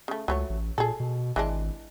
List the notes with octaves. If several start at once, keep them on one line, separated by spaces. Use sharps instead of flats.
C#3 A3
C#2 F#3 A3 C#5
A1
A#2 G#4 A4
B2
G#1 E3 G#3 D4